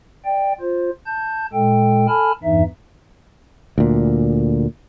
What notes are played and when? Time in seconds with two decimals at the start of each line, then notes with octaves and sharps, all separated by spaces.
0.25 D5 G5
0.61 F4 C5
1.06 A5 G6
1.53 A#2 G#3 A4 G5
2.08 A4 G#5 A5 B5 F6
2.43 E2 G2 E3 D#4 E5
3.78 D2 A#2